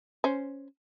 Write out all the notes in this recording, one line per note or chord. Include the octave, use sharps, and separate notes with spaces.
C#4 C5